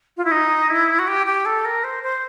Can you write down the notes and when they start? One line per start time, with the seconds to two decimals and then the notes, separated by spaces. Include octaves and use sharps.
0.17 F4
0.25 E4
0.31 D#4
0.69 E4
0.99 F#4
1.07 G4
1.26 G4
1.45 A4
1.65 A#4
1.84 C5
2.03 C5